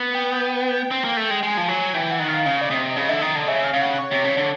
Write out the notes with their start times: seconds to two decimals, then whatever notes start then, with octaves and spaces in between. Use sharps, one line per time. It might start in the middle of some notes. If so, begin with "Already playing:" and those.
Already playing: B3
0.15 G5
0.91 C4
1.04 A#3
1.17 A3
1.30 G#3
1.43 G#3 G#5
1.57 F3
1.68 F#3
1.94 E3 G5
2.06 G5
2.11 F#5
2.20 D#3
2.28 F5
2.45 C#3 F5
2.61 D5
2.71 C3 D#5
2.96 C#3 D#5
3.09 D3 E5
3.21 D#3 D#5
3.35 D3
3.48 C#3 E5
3.64 F5
3.74 C#3
3.82 F#5
3.99 C#5
4.11 C3
4.25 C#3
4.37 D3